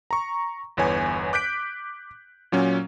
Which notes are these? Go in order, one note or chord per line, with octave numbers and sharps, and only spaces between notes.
A#5 C#6
G1 E2 B4 C#5 G#5
D6 F#6 G6 B6 D7
A#2 F#3 C#4